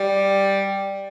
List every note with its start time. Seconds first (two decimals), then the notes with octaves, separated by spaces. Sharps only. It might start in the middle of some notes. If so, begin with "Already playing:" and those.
Already playing: G3